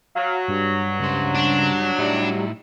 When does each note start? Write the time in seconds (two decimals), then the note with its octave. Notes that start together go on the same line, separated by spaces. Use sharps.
0.15 F#3 F5
0.48 G2
1.00 C#2 C#3 C5
1.35 D4
1.98 A2 G3 D#4 E4